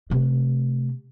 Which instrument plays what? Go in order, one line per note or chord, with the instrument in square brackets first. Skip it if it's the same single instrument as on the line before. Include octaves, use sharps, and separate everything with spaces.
[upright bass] C3 A3